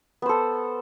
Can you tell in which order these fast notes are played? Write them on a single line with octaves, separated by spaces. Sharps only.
B3 C5 A4